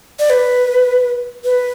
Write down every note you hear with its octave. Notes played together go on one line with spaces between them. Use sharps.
D5
B4
B4